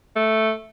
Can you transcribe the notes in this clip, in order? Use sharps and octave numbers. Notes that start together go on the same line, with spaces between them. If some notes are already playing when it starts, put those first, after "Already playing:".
A3